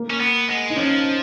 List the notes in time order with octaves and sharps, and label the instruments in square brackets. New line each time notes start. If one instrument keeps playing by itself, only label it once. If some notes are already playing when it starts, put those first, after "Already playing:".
Already playing: [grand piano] A#3
[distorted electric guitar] C#4
B3
G#3
[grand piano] D#4
[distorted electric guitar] F3 [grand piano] C#4